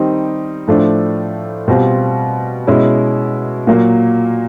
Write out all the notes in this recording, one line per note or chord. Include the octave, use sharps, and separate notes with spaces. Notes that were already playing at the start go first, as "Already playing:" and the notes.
Already playing: D#3 G3 C4 D#4
A2 F3 A3 D4
B2 G3 C4 F4
B2 G#3 C#4 E4
A#2 F#3 A#3